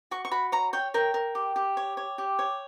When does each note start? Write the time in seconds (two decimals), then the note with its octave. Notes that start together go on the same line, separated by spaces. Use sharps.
0.11 F#4 C#6
0.25 C#6
0.31 F#4 B5
0.52 C#5 A#5
0.73 C#5 G5
0.94 A#4 G5
1.14 A#4
1.35 G4
1.56 G4
1.77 C#5
1.97 C#5
2.18 G4
2.39 C#5